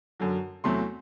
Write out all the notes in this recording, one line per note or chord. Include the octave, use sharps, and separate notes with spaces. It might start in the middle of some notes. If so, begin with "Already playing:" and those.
F#2 D3 F#3
E2 C3 F#3 A3 C6